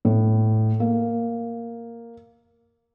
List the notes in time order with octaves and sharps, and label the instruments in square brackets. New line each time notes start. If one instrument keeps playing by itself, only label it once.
[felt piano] A2
A#3